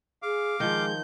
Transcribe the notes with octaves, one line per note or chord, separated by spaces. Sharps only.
G#4 F5 D6
D#3 F3 G#3 G6